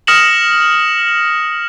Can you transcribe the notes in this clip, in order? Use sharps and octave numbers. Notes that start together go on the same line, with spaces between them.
D#6 F6 A#6 C#7 E7 F#7